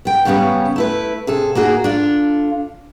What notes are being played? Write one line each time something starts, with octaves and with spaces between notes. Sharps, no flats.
B3 G5
F#2 C#3 G3 B3 C#4
A3 E4 B4
C3 G#4 A4
A#3 D#4 F#4 G#4
D4 F4 A4